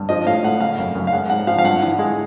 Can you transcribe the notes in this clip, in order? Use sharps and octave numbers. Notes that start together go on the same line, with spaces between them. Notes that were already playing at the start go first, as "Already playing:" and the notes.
Already playing: G2
F3 D#5
A2 F5
A2 F#5
C#3 F5
F#2
F#2
F5
G#3 F#5
G#2 F#5
F3 F5
F5
G2 F#5
E3
G#3